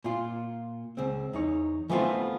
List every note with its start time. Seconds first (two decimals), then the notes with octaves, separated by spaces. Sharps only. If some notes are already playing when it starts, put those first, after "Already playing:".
0.04 A#2 F4
0.97 C#2 C4
1.33 E2 D#4 C#5
1.90 E3 F3 A3 B3 C4 F4